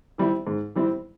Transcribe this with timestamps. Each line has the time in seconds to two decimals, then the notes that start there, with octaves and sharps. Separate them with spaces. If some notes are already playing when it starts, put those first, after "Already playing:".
0.18 E3 G3 C4 E4
0.47 G#2
0.75 E3 G3 C4 E4